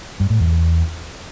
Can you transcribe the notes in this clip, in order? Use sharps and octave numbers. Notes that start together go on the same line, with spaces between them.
G2
A2
E2